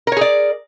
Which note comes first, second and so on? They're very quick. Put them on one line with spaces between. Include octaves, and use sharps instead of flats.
A#4 C#5 G#4 D5